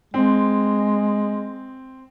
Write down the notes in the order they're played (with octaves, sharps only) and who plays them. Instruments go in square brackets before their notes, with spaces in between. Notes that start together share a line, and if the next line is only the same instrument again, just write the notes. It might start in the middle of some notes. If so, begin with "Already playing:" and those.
[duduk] G#3 [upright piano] C4